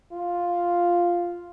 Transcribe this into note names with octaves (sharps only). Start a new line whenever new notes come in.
F4